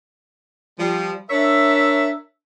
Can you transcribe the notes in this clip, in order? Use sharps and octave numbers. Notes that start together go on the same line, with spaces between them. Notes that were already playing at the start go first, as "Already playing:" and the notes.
F3 G3
D4 A#4 C#5 E5